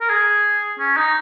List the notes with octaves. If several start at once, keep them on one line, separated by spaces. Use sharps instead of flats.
A#4
G#4
C#4
D#4